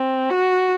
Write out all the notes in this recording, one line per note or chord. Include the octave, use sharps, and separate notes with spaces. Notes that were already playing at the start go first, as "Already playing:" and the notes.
Already playing: C4
F#4